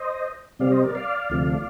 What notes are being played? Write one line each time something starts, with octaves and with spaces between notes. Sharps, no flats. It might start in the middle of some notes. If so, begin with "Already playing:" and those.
Already playing: C5 D#5
C3 G3 C4 D5 F5
C5 D#5
A#4 D5
D5 F5
D2 C3 F3 A3